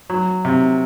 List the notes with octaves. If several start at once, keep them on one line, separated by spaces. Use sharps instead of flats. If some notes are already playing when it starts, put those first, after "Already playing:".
F#3
C3